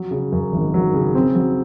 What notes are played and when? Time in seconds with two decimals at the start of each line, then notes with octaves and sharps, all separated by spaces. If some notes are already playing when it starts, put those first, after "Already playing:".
Already playing: F#3
0.11 C#3
0.32 F#2
0.52 G#1
0.74 F#3
0.94 C#3
1.15 C4
1.35 F#3